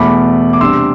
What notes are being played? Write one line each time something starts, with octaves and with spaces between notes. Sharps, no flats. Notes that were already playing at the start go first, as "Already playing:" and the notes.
Already playing: E2 B2 A3 B5 D6
D6
C3 G3 D4 C6 E6